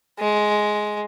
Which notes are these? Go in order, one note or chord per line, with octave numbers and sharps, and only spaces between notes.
G#3